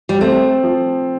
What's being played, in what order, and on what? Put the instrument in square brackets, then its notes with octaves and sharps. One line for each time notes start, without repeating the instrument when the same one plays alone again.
[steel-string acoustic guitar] G3
[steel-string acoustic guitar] A3 [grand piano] C4
[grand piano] F3